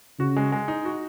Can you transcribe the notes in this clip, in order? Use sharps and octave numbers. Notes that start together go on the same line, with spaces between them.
C#3 F#4
G#3
G#3
D#4
F#4